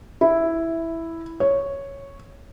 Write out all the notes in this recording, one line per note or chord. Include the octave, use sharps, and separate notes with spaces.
E4
C#5